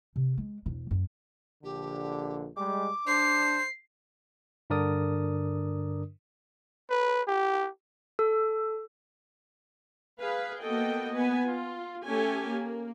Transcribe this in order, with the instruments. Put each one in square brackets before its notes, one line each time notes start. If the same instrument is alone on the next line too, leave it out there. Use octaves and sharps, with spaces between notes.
[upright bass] C3
G#3
E1 D4
F#2
[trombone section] A#1 D3 [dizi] G4
[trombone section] G3 G#3 [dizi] D6
[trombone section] D4 [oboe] C5 [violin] C7
[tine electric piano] G2 D3 D4 A#4 D5 D#6
[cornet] B4
G4
[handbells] A4
[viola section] G#4 B4 F5
A#3 B3 F#4 A4 D#5 G5
B3 B4 G#5
F4
A3 C#4 G4 A4 G#5
A#3